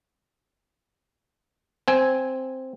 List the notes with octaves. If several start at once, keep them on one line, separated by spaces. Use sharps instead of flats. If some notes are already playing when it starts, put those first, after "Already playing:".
C4 G#5